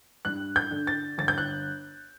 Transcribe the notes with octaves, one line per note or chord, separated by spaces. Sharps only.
G2 F#6
G6
D3
A6
G1 A6
G6
F#6